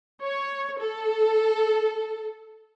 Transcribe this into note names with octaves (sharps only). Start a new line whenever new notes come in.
C#5
A4